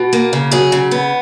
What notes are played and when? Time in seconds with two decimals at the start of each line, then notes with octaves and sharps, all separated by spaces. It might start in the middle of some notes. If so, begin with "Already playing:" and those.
Already playing: B2
0.13 A#3
0.33 C#3
0.51 F#3 G#4
0.72 C#3
0.91 B3